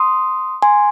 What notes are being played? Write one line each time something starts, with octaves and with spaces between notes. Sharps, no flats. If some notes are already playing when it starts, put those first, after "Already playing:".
Already playing: C6 D#6
G#5 C6